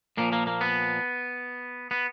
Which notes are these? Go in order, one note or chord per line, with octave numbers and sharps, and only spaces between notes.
A#2 F3 A#3
A#3
A#3
B3
B3